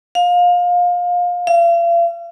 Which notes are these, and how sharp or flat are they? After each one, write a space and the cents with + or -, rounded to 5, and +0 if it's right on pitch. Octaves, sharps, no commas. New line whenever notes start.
F5 +25
F5 -40